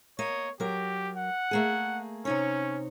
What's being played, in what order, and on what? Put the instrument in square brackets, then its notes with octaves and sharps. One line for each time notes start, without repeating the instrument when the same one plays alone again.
[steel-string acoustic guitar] A#3 D#5 [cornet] C#5
[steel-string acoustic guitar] F#3 A#4 [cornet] G4
[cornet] F#5
[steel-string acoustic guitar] A3 A#3 G#4
[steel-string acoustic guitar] C3 D#4 C#5 [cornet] C#4